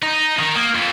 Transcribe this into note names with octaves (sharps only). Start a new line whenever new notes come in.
D#4
D#3
A#3
F2